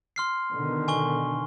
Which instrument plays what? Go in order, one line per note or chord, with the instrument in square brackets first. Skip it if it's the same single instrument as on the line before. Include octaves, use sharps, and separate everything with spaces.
[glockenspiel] C6 F6 C7
[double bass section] B2 D3 D#3
[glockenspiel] G#5 C#6 G7